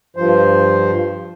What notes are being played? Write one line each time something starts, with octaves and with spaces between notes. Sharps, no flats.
G2 F3 C5